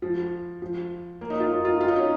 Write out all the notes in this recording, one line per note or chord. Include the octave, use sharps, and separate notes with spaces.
F3
F3
A#3
D#4
F4
D#4
F4
F4
D#4
C#4